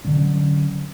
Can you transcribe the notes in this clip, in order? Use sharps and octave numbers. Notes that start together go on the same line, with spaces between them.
D3 F#3 C#4